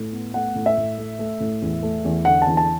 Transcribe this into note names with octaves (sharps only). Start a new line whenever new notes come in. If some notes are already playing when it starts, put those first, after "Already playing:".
Already playing: A2
B3
A3 F#5
A2
E5
A2
A3
A3
A2
E2
A3
E2
D3 F#5
A5
E2
A5